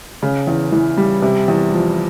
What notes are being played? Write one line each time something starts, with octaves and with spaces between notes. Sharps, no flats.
C#3
E2
E3
G3
C3
E2
F3